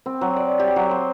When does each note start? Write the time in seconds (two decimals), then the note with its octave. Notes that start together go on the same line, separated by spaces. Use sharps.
0.06 C4
0.21 F#3
0.36 D5
0.60 G4
0.76 F#3
0.91 C5